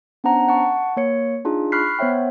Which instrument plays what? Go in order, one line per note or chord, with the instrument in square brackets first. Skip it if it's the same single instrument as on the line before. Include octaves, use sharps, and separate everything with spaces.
[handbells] B3 C#4 D4 C5 F#5 A#5
F#5 A5 C#6
A#3 C#5 C#7
D4 D#4 F4 G#4
B5 C#6 F6 F#6 B6 C7
B3 C5 C#5 E5 G5